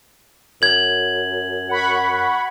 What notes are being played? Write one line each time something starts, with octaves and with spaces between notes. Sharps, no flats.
F#2 G#6 F#7
F#5 B5 C#6